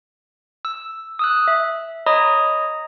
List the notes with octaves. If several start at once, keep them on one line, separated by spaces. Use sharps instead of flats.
E6
D#6 E6 F#6
E5
C#5 D#5 A#5 B5 D#6